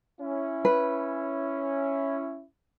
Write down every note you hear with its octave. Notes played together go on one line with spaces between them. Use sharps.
C#4 E4
B4